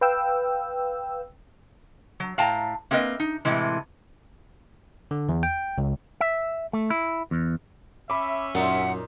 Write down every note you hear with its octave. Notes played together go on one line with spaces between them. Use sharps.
B4 F5 G5 E6
F#3
A2 F5 G5 A5 A#5
A#3 C4 A#4 B4 D#5
D#4
A2 C3 E3 G#3
D3
E2
G5
C#2
E5
A3
E4
E2
C#4 E5 B5 D6
F#2 A#2 D#4 A#4 F#5